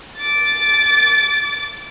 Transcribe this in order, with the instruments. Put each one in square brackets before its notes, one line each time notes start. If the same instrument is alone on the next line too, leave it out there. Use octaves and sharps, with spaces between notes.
[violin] D6 A6